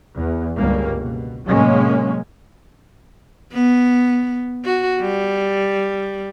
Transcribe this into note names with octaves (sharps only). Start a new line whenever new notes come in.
E2
G1 C#2 G2 G3 A#3
B2
A2 C3 F#3 G#3 A#3 C#4
B3
F#4
G3